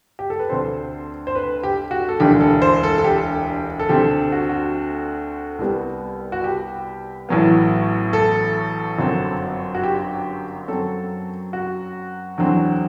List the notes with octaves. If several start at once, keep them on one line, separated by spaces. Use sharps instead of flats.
G4
A4
B4
D2 D3 A3 C4 C5
C5
B4
G4
F#4
A4
E1 D2 D3 G4
A4
C5
A4
A4
G4
A4
D2 D3 A3 C4 G4
F#4
F#4
C2 C3 G3 B3
F#4
G4
A1 A2 F#3 B3
A4
G1 F#2 F#3 C4
F#4
G4
F#2 F#3 C4 A4
F#4
E2 D3 F#3 C4